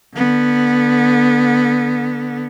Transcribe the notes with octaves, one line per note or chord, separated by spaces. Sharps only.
D3 B3